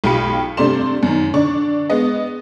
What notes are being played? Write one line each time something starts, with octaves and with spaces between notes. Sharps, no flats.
B1 F4 G4 G5 B5 C#7
G2 C3 A3 D5 C6 E7
F#2 D#3
D3 D5 C#6
G#3 B3 D#5